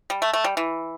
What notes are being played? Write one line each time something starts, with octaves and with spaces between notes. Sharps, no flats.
G3
A3
A3
G3
E3